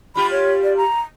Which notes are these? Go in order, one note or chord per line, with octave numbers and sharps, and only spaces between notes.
G3 F4 G4 B5
C#5
D5
A#5